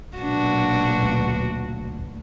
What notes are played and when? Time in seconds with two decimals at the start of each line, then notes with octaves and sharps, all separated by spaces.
0.18 B1 A#2 D4 F#4
1.02 D2